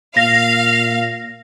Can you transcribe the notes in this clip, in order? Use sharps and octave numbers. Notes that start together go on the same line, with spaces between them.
A#2 F5 A#6